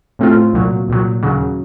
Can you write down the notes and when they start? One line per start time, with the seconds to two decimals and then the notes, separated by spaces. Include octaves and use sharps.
0.19 A2 A3 C4 F4
0.53 C2 A#2 F#3
0.88 C2 A#2 F#3
1.23 D#2 C#3 F#3